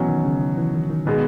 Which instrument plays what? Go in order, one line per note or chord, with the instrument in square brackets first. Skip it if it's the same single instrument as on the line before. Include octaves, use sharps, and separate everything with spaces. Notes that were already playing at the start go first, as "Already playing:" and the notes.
Already playing: [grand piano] B2 F#3 C#4 [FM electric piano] E3
[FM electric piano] D#3
C#3
D#3
E3
D#3
D#3
[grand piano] B2 G#3 [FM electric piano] D#3